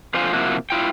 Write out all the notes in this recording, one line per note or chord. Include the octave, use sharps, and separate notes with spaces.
F2 D3 F4 C5 F5 G#5
C3 F3 A#3 E4 F#4
E4 F4 G5